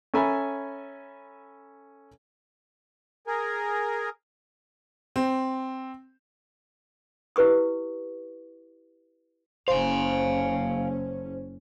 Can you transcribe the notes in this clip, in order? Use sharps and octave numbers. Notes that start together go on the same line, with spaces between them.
C#4 A4 E5 G#5 A#5 B5
G#4 A#4
C4
E4 G4 B4 C#6 D#6
F#1 C#4 C5 F5 G#5